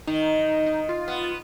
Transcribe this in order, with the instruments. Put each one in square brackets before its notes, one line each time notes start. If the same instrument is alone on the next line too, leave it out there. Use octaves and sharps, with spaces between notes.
[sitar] D#3 [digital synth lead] D#4
[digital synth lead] D#4
F4
[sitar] B3